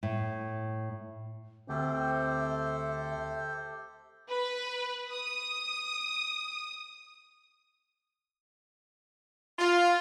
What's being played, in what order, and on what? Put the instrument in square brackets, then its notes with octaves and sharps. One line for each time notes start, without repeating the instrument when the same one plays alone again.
[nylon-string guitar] A2
[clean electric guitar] D2 [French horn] C4 [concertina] G4 A4 C5 [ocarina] E5
[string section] B4
D#6
[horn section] F4